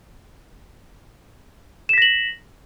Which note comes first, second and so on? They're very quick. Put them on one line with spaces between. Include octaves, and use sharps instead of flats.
E7 B6 A#6 F#7